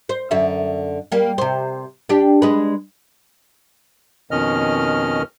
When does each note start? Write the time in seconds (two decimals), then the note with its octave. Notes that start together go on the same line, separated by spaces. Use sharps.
0.09 C5
0.31 F#2 D3 E5
1.12 G3 A#3
1.38 C3 C5
2.09 D4 G4
2.42 G#3 B4
4.31 F2 B2 D#3 C#4 D#5 F6